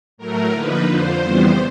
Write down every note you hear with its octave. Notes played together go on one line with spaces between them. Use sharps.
A2 F#3 A3 A#4
D3 F3 A#3 D#4 B4
F2 D3 F3 C5
F2 C#3 E3 G3 B3